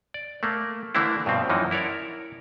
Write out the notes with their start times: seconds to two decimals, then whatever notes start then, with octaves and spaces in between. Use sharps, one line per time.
0.14 D5
0.43 A3 A#3
0.95 D3 E3 A3 A#3 D4 E4
1.26 G2 B2 C4
1.49 F#2 E3 F3 A#3 D#4
1.71 E4 A#4 C#5 D5